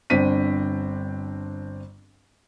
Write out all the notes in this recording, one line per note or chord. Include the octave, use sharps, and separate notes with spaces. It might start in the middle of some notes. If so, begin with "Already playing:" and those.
G1 C4 D4 B6 D#7